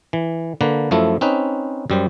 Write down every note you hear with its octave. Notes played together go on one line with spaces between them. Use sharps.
E3
D3 A#3 B4
F#2 F3 A3 E4
C4 C#4 D#4 B4
F#2 G3 C5